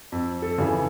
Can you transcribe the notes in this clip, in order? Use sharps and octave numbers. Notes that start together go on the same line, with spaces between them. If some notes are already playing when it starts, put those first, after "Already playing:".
F2
A4
C#3 E3